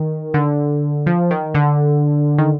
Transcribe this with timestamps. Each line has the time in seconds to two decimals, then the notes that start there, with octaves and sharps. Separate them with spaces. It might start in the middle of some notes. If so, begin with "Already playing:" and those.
Already playing: D#3
0.34 D3
1.06 F3
1.31 D#3
1.54 D3
2.38 D#3